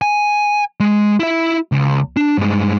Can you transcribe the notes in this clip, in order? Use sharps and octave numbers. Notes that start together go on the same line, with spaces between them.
G#5
G#3
E4 E5
C#2
D4
G2 G#3